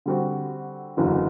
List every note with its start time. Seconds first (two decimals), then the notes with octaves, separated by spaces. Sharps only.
0.06 D3 G3 C4 F#4
0.97 F#1 E2 D3 F#3